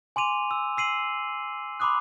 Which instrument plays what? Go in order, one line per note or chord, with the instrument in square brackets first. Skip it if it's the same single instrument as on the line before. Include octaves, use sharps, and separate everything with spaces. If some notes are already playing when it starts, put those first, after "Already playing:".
[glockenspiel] G#5 C6 D6 D#7 F7
E6
E6 C7 D#7 F#7
B5 C6 D6 D#6 F#6